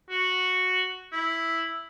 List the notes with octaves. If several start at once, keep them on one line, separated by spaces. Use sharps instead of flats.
F#4
E4